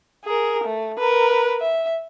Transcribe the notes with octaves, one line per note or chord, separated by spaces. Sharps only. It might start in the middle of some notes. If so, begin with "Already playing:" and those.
G#4 A#4
A3
A#4 B4
E5